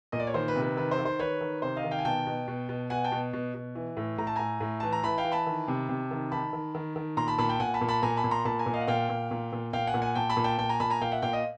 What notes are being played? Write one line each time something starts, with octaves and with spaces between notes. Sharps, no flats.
A#2 D#5
D5
C#5
D#3 C5
B4
C3
B4
D#3 B4
C5
D#3
C5
D#3 B4 C#5
D#3
C3 C5
D#5 F5
D#3
F5 G5
G#5
B2 G5 A5
B2
B2
B2
B2 F#5 G#5
G5 A5
B2
B2
B2
E3
A2
A2 A#5
A5
A2 G#5 A#5
A2
E3 A5
A#5
E3 A5 B5
F5 G5
E3
A5 B5
D#3
C3
C3
D#3
D#3 A5 B5
D#3
D#3
D#3
A#2 A#5 C6
A5 B5
A#2 A5 B5
G5 A5
A#2 F#5 G#5
A5 B5
A#2
A5 B5
A#2 G#5 A#5
A5 B5
A#2
A#5 C6
A#2 A5 B5
G#5 A#5
A#2
D#5 F5
F#5
A#2 F5 G5
A#2
A#2
A#2
A#2 F5 G5
F#5 G#5
A#2
F#5 G#5
A#2 G5 A5
A5 B5
A#2
G5 A5
A#2 G5 A5
G#5 A#5
A#2 A5 B5
G#5 A#5
A#2 F5 G5
E5 F#5
A#2 F5 G5
D#5 F5